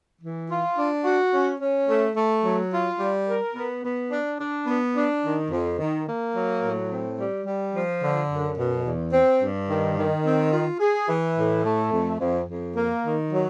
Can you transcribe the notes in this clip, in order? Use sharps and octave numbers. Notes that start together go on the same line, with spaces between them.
E3
F4
D4
F#4
C#4
C#4
A3
A3
F#3
F4
G3
A#4
B3
B3
D4
D4
B3
D4
D#3
F2
D#3
A#3
F#3
A2
C4
G3
G3
F3
D3
F#2
B2
E2
C4
G2
D#3
D#3
C4
F4
G#4
E3
A2
A3
F2
F2
F2
A#3
D#3
F#3